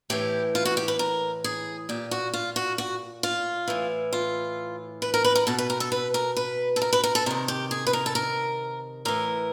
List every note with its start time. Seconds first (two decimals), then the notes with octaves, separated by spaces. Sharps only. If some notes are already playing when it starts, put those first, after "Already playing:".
0.10 A2 E3 G4
0.55 F4
0.65 F#4
0.77 G4
0.88 B4
0.99 A#4
1.44 G#4
1.89 A#2 G4
2.11 F#4
2.34 F4
2.56 F#4
2.78 F#4
3.23 F4
3.68 A2 E3
4.13 F4
5.02 B4
5.14 A#4
5.24 B4
5.35 A#4
5.47 B2 A4
5.59 B4
5.70 A#4
5.80 A4
5.92 B4
6.14 A#4
6.37 B4
6.76 A4
6.82 A#4
6.93 B4
7.04 A#4
7.15 A4
7.26 C3 D#3 A#4
7.48 G4
7.71 G#4
7.87 B4
7.93 A#4
8.06 A4
8.15 A#4
9.05 A2 E3 A#4